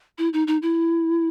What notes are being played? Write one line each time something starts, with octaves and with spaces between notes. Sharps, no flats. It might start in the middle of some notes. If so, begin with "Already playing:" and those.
E4
D#4
D#4
E4